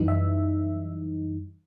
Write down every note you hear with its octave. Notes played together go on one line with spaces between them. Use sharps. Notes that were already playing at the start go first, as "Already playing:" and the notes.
Already playing: F#2 E3 G3 D#4
E5